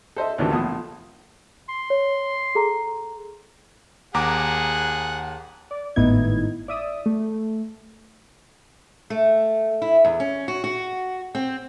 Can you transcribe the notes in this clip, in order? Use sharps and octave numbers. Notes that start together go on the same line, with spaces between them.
A4 C5 D#5 E5
D2 A2 C3 D#3 E3 A3
A#1 E2 F3 A3 D#6
C6
C#5
G#4 A4 A#5
D#2 G#4 F#5 A#5 D6
D5
G#1 A2 B3 D#4 E4 G#6
D5 E5 D#6
A3
A3
E4
E2
C#4
F#4
F#4
C4